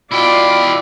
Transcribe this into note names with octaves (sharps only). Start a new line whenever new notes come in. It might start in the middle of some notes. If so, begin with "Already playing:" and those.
B2 E4 F4 D5 G5 B5